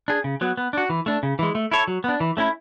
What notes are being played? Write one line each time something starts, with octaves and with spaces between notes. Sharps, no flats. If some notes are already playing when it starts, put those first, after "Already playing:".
D4 G#4
C#3
F#3 B3
B3
D4 F#4
E3
A3 D4
C#3
E3 G#3
A3
E4 A4 C#5
F#3
B3 D4
E3
A3 C#4 E4